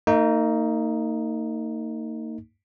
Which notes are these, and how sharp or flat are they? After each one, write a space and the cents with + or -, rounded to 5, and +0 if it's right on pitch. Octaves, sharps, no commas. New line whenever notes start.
A#3 -40 D#4 +5